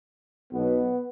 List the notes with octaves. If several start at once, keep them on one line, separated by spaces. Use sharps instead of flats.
B1 B2 F#3 B3